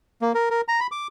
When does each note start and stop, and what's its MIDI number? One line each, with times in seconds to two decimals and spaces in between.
0.22 0.32 58
0.35 0.49 70
0.50 0.61 70
0.68 0.80 82
0.80 0.87 83
0.92 1.07 86